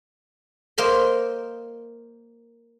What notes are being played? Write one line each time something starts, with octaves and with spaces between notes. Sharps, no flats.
A#3 A#4 C5 D#5 C6